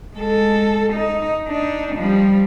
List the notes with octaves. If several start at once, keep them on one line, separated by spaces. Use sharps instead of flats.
G#3 A4
D#4
D4 D#4
F3 G3